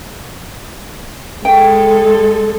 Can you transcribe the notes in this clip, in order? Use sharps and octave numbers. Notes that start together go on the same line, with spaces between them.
G#3 A4 G5